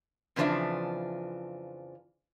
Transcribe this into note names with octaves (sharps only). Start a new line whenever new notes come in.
F2 C#3 E3 F3 D4 E5